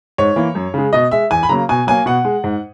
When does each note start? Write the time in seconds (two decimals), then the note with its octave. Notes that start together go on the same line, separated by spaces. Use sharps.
0.18 G#2 C#5
0.36 E3 A#3
0.55 F#2
0.74 C#3 G#3
0.93 B2 D#5
1.11 G#3 E5
1.31 E2 G#5
1.43 B5
1.49 C#3 F#3 A#3 A#5
1.69 B2 G#5
1.87 F#3 A#3 G#5
2.06 B2 F#5
2.24 G#3
2.44 G#2